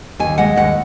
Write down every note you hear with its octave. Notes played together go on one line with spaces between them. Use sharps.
D#2 G#5
G#3 F#5
D#2 F#5